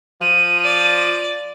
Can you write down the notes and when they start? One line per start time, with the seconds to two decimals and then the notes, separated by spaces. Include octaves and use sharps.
0.22 F3 D#7
0.64 D5